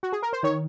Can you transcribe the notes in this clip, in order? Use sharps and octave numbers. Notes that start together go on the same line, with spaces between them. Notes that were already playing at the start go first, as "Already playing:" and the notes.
F#4
G#4
A#4
C5
D#3 C#5